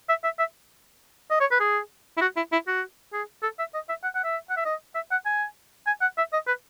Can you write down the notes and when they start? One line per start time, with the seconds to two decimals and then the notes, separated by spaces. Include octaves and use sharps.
0.09 E5
0.24 E5
0.39 E5
1.31 D#5
1.41 C#5
1.51 B4
1.60 G#4
2.17 E4
2.21 F#4
2.37 E4
2.52 E4
2.68 F#4
3.13 G#4
3.43 A4
3.59 E5
3.74 D#5
3.89 E5
4.04 F#5
4.15 F#5
4.25 E5
4.50 F#5
4.57 E5
4.66 D#5
4.95 E5
5.11 F#5
5.26 G#5
5.87 G#5
6.02 F#5
6.18 E5
6.33 D#5
6.47 B4